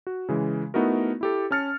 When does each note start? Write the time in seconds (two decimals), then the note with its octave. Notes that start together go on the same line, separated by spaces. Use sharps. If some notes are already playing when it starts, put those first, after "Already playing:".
0.07 F#4
0.29 C#3 E3 G#3
0.74 A3 B3 D#4 E4 F#4 A#4
1.21 E4 G4 A4
1.51 C#4 A5 F6 A6 C#7